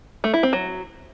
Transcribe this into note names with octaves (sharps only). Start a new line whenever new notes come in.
A3
E4
C4
F#3